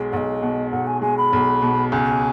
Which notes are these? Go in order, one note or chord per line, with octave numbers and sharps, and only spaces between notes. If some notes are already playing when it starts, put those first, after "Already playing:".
Already playing: B1 G#3
B1 D#5 F#5
B2
B1 F#5
G#5
G#3 G#5
B5
B1
B2
C#2 G#5